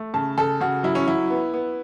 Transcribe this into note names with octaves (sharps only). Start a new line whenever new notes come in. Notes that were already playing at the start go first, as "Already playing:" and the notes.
Already playing: A3
C#3 A5
C#3 A4
C#3 F#4
F#3 E4
C#4
F#3 E4
B3
B3